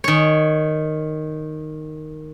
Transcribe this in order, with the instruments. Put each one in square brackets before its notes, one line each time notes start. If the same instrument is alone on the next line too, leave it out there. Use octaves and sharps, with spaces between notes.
[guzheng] D#3 C#5